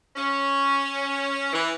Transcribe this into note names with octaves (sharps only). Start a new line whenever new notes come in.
C#4
E3